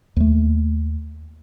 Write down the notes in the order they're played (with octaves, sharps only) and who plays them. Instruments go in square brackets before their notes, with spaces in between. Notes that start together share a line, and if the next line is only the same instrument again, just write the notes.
[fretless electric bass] D#2 A3